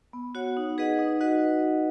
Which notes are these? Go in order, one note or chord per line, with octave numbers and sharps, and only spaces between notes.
B3
F#4 C#5 F#5
D#4
G#4 B4 D#5 F#5
D#4
F#4 B4 D#5 F#5